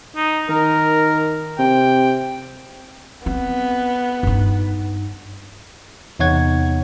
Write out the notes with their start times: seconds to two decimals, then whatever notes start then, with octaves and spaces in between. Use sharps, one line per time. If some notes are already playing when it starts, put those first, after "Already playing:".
0.16 D#4
0.49 D#3 A#4
1.59 C3 G5
3.26 B3 C4
4.23 G2 D#4
6.19 E2 C3 D#4 C#5 F#5 G#6